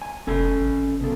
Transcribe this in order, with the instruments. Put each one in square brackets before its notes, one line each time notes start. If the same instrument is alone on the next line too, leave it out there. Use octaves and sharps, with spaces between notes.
[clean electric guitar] G#5
[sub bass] F1 [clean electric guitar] C#4 A4 G#5
[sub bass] G#1
[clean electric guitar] B2 A4